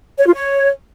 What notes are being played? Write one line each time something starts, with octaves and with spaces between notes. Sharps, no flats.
C#5
F4
C#5